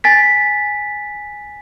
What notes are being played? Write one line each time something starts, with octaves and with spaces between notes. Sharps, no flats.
G#5 A6 B6